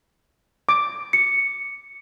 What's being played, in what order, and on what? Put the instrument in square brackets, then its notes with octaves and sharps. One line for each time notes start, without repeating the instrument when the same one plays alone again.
[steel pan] D6
[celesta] C#7